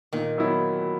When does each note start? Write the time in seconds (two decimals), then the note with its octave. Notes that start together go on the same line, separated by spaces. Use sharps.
0.13 A#2 D#3
0.38 F#3 B3 E4